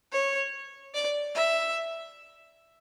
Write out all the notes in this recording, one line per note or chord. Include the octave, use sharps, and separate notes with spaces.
C#5
D5
E5